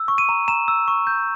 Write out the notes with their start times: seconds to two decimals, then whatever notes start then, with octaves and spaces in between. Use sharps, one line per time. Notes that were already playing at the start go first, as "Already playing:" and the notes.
Already playing: E6
0.08 C#6
0.18 D#7
0.29 A#5
0.48 A#5 E7
0.68 E6
0.88 C#6
1.07 G6